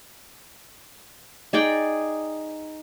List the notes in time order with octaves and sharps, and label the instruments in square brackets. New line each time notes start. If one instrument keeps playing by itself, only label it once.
[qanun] D#4 G#4 D5 G5